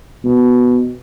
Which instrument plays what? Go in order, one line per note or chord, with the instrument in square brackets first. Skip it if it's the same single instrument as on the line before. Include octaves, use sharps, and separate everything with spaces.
[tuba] B2